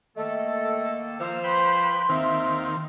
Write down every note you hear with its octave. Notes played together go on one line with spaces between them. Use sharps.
D#3 A3 A#3 A4 D#5
F3 A#3 C5 E6
B4 G5 B5 C6
D#2 D#3 C4 E5 F5